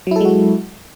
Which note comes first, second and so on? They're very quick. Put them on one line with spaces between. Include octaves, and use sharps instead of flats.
F#3 E4 A4 G#3 F#4